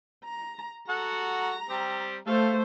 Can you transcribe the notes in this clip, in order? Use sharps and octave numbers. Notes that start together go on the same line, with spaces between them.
A#5
F#4 A4 F#5 A#5
G3 C4 G4
A3 A4 C5 F5